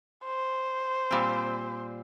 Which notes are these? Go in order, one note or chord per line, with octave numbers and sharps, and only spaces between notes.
C5
A#2 G3 C4